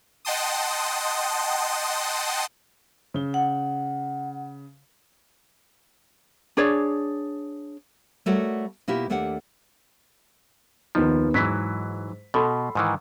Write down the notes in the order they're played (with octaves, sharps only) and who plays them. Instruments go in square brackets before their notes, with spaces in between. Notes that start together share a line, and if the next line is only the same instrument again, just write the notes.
[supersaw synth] D#5 F#5 G5 A5 C6 D#6
[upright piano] C#3 G7
[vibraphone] F#5
[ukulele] D4 G#4 C#5 D5
[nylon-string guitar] G3 A3 F#4 A#4 C#5 F#5
B2 A#3 E4 F4 G4
D#2 A3 A#3 D4 G4 F#5
[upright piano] D#2 B3 D#4 [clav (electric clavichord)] F3
[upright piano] G#2 B6 [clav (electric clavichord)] E3 F#3
[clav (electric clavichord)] B2 [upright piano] A4 B5 C6
[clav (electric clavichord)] G#2 D#3 E3